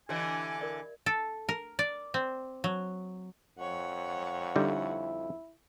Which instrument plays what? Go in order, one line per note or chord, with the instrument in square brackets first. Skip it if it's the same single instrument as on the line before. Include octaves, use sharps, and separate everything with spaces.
[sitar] D3 E3 [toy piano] G4 C#5 D#5 [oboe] G#5
[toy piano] A#4 D5 E5
[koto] A4
A#4
D5
C4
F#3
[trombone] F2 [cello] C#5 F#5
[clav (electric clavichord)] D3 G3 D#4 [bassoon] E4